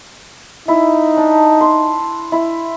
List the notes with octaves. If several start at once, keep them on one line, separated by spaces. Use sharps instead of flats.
D#4 E4
D4
C6
E4